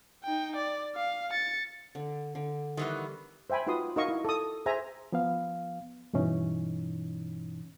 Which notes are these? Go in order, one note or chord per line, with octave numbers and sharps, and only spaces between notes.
D#4 G5
D5
F5
A6 C#7
D3
D3
D#3 E3 G3 B3
C5 E5 G5 G#5 B5
D#4 F4 F#4 B4 C6 D#6
D#4 F#4 A#4 D#5 F5 C#6
E4
A4 D#6
G#4 C5 E5 G#5 A#5
F3 B3 F5
G2 B2 E3 C#4 D#4